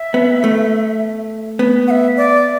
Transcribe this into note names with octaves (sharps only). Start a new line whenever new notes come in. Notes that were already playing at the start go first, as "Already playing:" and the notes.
Already playing: E5
B3
A3
B3
F#5
E5
D5